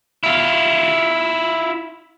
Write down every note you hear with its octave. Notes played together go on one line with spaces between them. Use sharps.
E4 F4